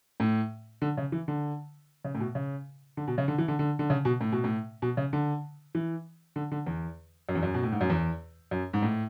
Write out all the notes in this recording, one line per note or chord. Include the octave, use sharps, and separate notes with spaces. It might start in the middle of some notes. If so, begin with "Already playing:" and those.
A2
D3
C#3
E3
D3
C#3
A2
B2
C#3
D3
B2
C#3
D3
E3
D3
D3
D3
C#3
B2
A2
B2
A2
B2
C#3
D3
E3
D3
D3
E2
F#2
E2
F#2
B2
A2
G#2
F#2
E2
F#2
G#2
A2